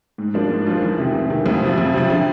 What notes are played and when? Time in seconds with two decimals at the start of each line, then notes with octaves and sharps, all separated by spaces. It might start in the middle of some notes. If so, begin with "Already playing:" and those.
0.18 G#2
0.34 F3 A#3 D4 F4
0.50 G#2
0.66 F3 A#3 D4 F4
0.82 E2
0.98 C3 D#3
1.14 E2
1.30 C3 D#3
1.46 F2
1.62 C3 F3
1.78 F2
1.94 C3 F3
2.10 D3